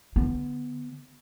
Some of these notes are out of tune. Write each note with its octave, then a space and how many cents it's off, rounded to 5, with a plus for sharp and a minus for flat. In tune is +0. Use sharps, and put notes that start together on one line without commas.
D3 +0 B3 +0